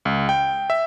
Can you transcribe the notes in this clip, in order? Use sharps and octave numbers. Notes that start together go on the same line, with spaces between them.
C#2
G5
E5